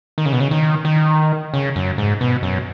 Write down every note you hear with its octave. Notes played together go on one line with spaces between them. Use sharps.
D#3
C#3
B2
C#3
D#3
D#3
C#3
F#2
G#2
B2
F#2